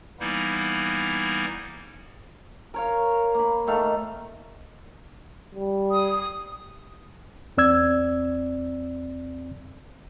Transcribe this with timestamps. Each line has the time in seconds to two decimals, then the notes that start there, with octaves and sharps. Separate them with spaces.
0.20 E3 G3 A#3 B3 D#4 E4
2.74 A#4 C#5 F5
3.35 A#3 B5
3.67 D#3 A3 F5
5.55 G3
5.91 D#6
7.57 E2 C4 D5 E6 G#6